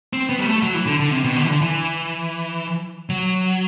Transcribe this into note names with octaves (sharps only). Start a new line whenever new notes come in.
C4
B3
G3
A3
F#3
E3
D3
D3
C3
B2
D3
E3
D3
E3
F#3